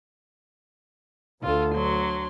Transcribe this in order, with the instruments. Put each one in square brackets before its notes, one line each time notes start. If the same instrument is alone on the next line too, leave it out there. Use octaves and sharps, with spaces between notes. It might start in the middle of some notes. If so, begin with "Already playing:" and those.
[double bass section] D2 [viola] F4 A4
[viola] F#3 C6